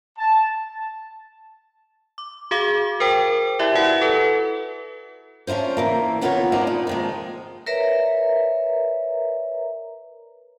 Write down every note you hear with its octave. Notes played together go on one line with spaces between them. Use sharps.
A5
D6
F#4 G#4 F5 D6
A#4 C5 G5
E4 G4 D5 E5
E4 F#4 B4 E5 F#5
A4 B4
C#4 D4 E4 F4 C5
C#3 E3 A#3
A#2 B3 D#4 F4 B4 C#5
G#3 A#3 B3 D4 D#4 C5
A#2
D#3 F3 G#3
A#4 B4 C#5 D5 E5 A#5